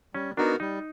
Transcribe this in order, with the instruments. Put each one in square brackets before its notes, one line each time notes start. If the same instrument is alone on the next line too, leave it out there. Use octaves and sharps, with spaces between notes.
[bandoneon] G3 [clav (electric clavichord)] C#4
[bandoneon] B3 D#4 F#4 A#4 [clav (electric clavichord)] D4
[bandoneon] G3 [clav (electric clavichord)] D#4